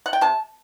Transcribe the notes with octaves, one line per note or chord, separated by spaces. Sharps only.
F#5
G5
C3 A5